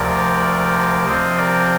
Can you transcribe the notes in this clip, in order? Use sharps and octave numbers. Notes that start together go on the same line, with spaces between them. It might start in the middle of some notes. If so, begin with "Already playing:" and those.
Already playing: D2 C3 F3 A#4 D5
C3 F3 C4 C5 D#5
A#4 D5